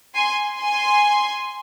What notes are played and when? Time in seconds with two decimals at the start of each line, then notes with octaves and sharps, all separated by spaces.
0.15 G#5 C6
0.59 G#5 C6